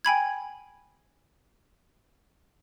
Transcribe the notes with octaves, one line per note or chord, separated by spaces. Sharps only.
G5 G#5 B5 G#6